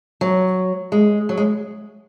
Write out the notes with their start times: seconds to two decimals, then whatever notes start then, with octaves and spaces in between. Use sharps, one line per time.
0.21 F#3
0.92 G#3
1.29 F#3
1.37 G#3